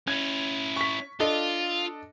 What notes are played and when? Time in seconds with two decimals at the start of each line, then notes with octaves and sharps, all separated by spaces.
0.08 C#4 E4 G#6
0.76 C#6 B6
1.20 D4 F4 A4 D#5